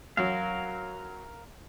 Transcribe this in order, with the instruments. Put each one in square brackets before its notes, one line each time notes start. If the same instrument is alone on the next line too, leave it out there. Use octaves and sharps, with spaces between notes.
[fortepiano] F#2 F#3 [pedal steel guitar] A#4 F5